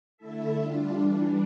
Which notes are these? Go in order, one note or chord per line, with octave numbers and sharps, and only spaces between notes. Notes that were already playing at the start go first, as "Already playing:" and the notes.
D3 A3 E4 A4 E5
G3 D4 F4
E3 G3 D4